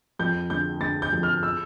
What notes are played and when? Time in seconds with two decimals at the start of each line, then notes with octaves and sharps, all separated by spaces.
0.19 F2 G6
0.50 D3 G6
0.81 D3 A6
1.02 G6
1.13 F2
1.23 F6
1.43 E6